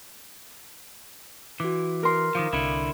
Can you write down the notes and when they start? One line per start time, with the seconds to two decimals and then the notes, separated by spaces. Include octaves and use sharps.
1.60 E3 F#4 D6
2.03 A#4 C6
2.35 D#3 F3 F5 D6 D#6
2.53 C2 D3 E4